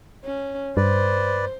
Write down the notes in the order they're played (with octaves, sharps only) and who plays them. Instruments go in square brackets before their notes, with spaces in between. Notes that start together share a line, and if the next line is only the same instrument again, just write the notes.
[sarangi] C#4
[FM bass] G2 [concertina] B4 D5 [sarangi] C5